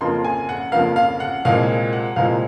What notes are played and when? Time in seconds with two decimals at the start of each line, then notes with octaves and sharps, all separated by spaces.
0.01 F2 C#3 F3 A#3 C6
0.24 G#5
0.49 F#5
0.72 F2 C#3 F3 A#3 F5
0.96 F5
1.20 F#5
1.45 C2 A#2 F3 G#3 C4 F5
1.93 F#5
2.16 C2 A#2 F3 G#3 C4 F5